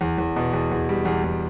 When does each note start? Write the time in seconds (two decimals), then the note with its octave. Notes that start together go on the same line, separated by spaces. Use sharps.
0.01 E2
0.18 E2
0.36 B2
0.53 E2
0.71 E2
0.89 G3
1.05 E2
1.24 E2